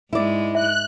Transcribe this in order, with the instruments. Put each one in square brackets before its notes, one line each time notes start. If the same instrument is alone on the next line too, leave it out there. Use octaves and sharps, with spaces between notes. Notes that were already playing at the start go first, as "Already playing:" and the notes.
[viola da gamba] G#2 G#3 [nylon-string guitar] E4 D5
[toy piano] E5 [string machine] F#6